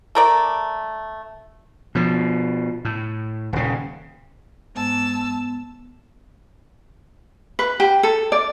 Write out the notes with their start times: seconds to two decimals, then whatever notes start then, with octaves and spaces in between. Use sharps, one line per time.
0.15 A3 A#4 D5
1.95 B2 F3
2.85 A2
3.53 D#1 C#3
4.75 G#2 B3 A5 E6
7.59 B4
7.80 G4
8.03 A4
8.32 D5